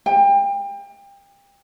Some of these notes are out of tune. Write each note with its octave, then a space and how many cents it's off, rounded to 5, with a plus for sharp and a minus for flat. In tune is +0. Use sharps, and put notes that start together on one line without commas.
G5 +30